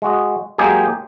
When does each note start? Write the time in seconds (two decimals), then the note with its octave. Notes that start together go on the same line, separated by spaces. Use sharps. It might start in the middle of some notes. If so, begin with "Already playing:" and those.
0.02 G#3 F#4 D#5
0.58 F#3 G#3 A#3 D#4 G4 G#4